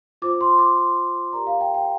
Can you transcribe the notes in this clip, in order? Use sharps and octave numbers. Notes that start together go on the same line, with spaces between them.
F4 C5 D6
C6
D6
C6
G4 A#4 D5 A#5
F5
G5
G5